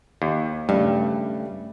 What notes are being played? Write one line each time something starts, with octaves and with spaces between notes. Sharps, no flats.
D#2
G2 C#3 A3 D5